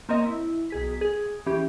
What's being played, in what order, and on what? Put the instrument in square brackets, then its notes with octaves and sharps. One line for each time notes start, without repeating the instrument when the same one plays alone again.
[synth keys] A#3 C4 A#4 C#5 D#5
E4
B1 G#4 B6
G#4
E3 C#4 G4